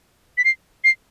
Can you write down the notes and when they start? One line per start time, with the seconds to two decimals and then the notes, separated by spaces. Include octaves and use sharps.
0.38 B6
0.45 C7
0.84 C7